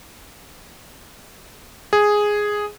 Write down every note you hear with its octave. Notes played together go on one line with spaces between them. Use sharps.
G#4